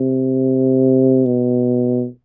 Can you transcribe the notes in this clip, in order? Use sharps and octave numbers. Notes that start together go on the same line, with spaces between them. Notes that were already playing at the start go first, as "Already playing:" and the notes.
Already playing: C3
B2